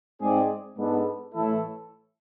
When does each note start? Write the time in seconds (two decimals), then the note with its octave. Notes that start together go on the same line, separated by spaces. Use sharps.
0.19 G#2 G#3 C4 G#4 D5
0.77 G#2 G#3 B3 D4 A4
1.34 A2 E3 A3 E4 A4